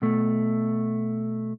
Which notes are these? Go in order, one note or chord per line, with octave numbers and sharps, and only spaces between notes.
B2 A3